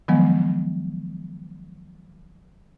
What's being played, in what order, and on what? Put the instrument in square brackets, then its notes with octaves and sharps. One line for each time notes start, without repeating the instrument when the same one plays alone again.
[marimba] D#3 F3 F#3 G#3 B3